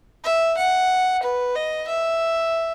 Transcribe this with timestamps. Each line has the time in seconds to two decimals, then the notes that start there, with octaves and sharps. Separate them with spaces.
0.25 E5
0.58 F#5
1.23 B4
1.55 D#5
1.88 E5